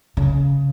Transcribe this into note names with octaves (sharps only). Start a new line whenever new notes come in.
C#3